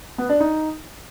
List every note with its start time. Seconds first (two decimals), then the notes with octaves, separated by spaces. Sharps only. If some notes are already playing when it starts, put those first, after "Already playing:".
0.18 B3
0.29 D4
0.40 D#4